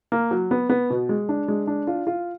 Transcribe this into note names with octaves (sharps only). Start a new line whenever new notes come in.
A#3
F#3
B3
B3
B2
G#3
D4
G#3
D4
F4
F4